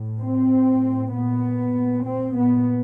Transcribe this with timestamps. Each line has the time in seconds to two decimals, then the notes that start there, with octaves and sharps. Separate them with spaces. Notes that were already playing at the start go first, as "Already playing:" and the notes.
Already playing: A2
0.20 C4
0.50 A2
1.12 A#2 B3
1.74 A#2
2.05 C4
2.35 A#2 B3